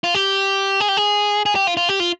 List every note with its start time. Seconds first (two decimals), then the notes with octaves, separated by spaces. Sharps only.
0.04 F4
0.15 G4
0.80 G#4
0.89 G4
0.97 G#4
1.46 G#4
1.55 G4
1.67 F4
1.77 F4
1.89 G4
2.00 F4